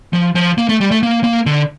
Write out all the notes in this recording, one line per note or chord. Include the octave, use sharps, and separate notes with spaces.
F3
F3
A#3
A3
G3
A3
A#3
A#3
D3